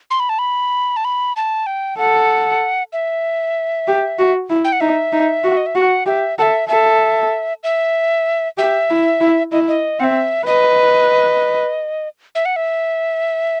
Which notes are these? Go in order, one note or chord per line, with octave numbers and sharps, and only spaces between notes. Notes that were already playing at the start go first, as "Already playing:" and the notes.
C6
B5
A5
B5
A5
B5
A5
G5
A4 F#5
E5
G4
F#4
E4
G5
F#5
D#4 E5
D#4
F#4
D#5
E5
F#4 F#5
G4 E5
A4 E5 F#5
A4 E5
E5
G4 E5
E4
E4
E4 D#5
D#5
C4 E5 F#5
B4 D#5
E5
F#5
E5